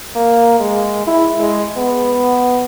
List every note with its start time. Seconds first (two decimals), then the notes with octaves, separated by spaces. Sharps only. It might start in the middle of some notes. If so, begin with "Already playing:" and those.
0.15 A#3
0.60 G#3
1.07 E4
1.40 G#3
1.76 B3